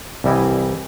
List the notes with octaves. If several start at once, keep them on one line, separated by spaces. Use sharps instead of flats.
C2 E3 G3 E4 D#5 G#5